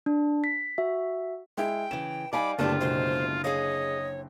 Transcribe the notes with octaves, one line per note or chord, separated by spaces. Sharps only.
D4
B6
F#4 E5
G#3 E4 G5
C#3 E3 E7
G3 D#4 D5 F5 G#5 B5 D6
F#1 D3 A3 B3 F4 G4 D5 A5
B2 G#3 C5
G#4 C#5 D#5 F5